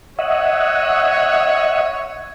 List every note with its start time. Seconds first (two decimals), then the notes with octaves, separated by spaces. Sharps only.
0.19 C#5 D#5 E5 F#5